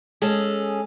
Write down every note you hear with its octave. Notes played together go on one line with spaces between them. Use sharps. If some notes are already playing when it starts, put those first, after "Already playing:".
G#3 C#4 G#4 A4